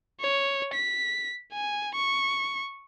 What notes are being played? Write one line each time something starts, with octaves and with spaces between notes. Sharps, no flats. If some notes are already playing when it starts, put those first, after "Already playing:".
C#5
B6
G#5
C#6